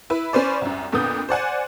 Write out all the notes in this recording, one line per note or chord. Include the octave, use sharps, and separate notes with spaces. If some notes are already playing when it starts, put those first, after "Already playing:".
E4 B4
C#4 B4 C5 D5
C2 F#2
F2 A#2 D3 B3 D#6 G6
C5 D5 F#5 G#5